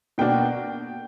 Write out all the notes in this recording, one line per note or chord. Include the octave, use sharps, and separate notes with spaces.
B2 A#3 D4 F#4 G5